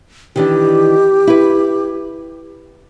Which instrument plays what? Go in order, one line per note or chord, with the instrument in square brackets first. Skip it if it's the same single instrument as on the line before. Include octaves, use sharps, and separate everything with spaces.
[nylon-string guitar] D#3 E3 D4 [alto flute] G4
[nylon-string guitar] E4 B4